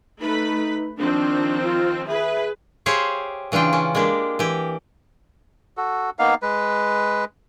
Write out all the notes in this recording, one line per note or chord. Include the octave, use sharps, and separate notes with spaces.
A3 D#4 B4 B5
D#3 F3 C4 D4
F4
G#4 B4 E5
G4 G#4 C5 C#5 E5 F5
C#3 E3 D4 F4 G5
C#4
G#3 A#3 D4 G4
E3 G4
F#4 A4
A#3 B3 D#4 F5
G#3 B4